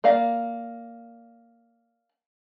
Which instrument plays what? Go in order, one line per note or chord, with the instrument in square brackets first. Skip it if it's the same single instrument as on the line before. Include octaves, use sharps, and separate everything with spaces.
[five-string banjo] A#3 D5 F5